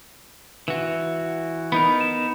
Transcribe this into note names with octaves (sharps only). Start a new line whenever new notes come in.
E3 F#4
B3 D#4 A#4 B5
E7